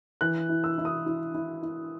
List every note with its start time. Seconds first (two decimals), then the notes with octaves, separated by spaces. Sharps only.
0.21 E3 F#6
0.49 E4
0.64 E6
0.78 E4
0.85 D#6
1.06 E4
1.35 E4
1.63 E4